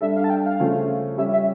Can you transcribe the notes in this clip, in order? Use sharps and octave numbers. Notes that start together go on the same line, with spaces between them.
G3 D4 A4 E5
F5
A5
G5
F5
C#3 F3 A3 C#4 F4
G3 C#4 G4 E5
E5